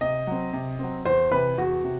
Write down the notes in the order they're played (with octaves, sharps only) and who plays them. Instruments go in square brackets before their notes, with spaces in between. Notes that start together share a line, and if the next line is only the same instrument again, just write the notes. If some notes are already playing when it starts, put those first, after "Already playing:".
[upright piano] C3 [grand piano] D#5
[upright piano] F#3 C4
C3
F#3 C4
[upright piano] E2 [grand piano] C5
[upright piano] C3 E3 [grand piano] B4
[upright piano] E2 [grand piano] F#4
[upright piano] C3